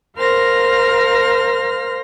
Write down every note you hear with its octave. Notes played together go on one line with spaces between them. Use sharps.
A#4 C5 F5 F6 A#6